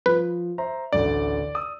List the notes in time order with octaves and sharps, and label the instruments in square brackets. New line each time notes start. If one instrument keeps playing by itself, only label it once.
[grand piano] F3 [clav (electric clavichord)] B4
[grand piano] C5 E5 A#5
[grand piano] A1 D2 D3 [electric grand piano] D5
[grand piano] D#6 E6